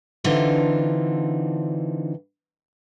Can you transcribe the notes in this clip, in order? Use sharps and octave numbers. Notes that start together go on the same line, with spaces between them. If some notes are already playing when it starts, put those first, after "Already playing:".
D3 E3 C4 D4 D#4 F4